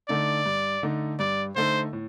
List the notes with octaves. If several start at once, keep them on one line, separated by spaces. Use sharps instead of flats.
D3 A3 D#4 D5
G2
D3 A3 D#4
G2 D5
D3 A3 D#4 C5
A2